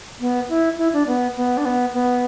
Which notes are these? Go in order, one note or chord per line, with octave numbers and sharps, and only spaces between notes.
B3
E4
E4
D4
B3
B3
D4
B3
B3